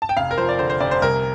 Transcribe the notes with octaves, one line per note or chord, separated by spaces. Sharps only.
A5
G5
F1 F5
A#4
F3 C5
D5
D3 C5
C5
F1 D5
C5
C2 A#4